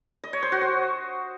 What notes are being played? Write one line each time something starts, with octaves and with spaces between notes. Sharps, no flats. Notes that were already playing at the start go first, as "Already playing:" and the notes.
D#5
C#5
C5
F#4
C5